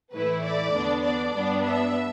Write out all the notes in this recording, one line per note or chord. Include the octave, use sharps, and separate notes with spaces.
A2 E3 A3 E4 B4
D5
E2 D3 B3 D4
D5
G2 G3 B3 D4
E5